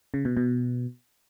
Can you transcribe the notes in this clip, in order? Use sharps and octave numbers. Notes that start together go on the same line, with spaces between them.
C#3
B2
B2